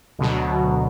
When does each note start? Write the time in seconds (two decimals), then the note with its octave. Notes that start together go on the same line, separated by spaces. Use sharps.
0.19 D2 B2 F#3